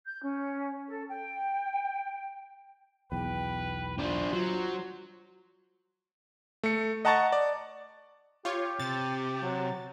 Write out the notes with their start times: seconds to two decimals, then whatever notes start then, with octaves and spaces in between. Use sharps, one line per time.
0.06 G6
0.22 C#4
0.88 A4
1.09 G5
3.12 B1 E2 B4 G5
3.98 D4 F4 C5
4.32 F#3 F4
6.63 A3 C#7
7.05 D#5 F#5 A5 A#5 C#6 A6
7.32 D5
8.45 F4 G4 C#5
8.80 C3 A6
9.42 F#3